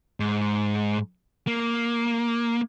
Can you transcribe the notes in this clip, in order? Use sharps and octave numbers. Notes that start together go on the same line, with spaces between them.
G#2
A#3